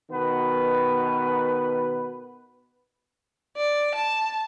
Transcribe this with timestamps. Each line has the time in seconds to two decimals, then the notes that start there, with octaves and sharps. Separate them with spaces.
0.10 B2 D#3 B3 B4
3.57 D5
3.95 A5